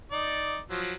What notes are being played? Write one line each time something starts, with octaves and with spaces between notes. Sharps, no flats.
D#4 D5
F3 F#3